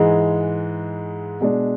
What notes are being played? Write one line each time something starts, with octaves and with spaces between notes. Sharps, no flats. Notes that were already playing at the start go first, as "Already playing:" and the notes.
Already playing: G#2 E3 G#3
B2 G#3 D4